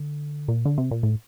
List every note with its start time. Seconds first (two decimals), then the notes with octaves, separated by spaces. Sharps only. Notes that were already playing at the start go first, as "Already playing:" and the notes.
Already playing: D3
0.48 A#2
0.65 D3
0.78 C3
0.91 A#2
1.03 A2